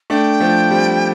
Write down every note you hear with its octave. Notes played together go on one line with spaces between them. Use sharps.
A3 D4 G5
F3 A3
G3 C4